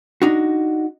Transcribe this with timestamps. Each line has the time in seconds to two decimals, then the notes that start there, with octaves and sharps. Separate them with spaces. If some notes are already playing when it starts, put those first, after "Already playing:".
0.22 D4 D#4 F#4